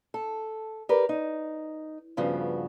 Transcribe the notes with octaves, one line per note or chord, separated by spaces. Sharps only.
A4
G4 A#4 B4 D5
D#4
G2 C#3 F3 B3 F#4